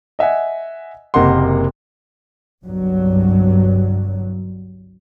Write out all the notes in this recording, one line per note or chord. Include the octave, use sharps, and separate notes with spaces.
D#5 E5 F#5 G#5
F#1 C3 A#3 D#5 F#5 C6
G1 C2 G2 F#3